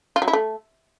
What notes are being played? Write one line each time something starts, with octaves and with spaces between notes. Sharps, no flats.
F4
F#3
E4
A3